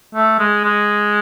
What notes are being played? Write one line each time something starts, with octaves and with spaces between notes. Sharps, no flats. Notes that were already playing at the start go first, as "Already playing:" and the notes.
A3
G#3
G#3